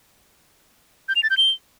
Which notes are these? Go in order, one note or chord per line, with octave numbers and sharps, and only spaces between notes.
G6
F7
A6
G6
G7